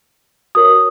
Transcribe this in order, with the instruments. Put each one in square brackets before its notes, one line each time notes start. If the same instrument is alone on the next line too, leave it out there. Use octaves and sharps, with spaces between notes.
[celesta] F#4 A#4 C#5 D#6